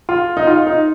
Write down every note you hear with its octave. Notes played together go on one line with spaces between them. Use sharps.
F4
D#4
F4
D#4